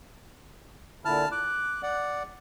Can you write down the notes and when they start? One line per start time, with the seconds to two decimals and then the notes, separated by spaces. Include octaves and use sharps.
1.05 A#2 D3 E4 A5 F6
1.32 D6 F#6
1.83 D5 F#5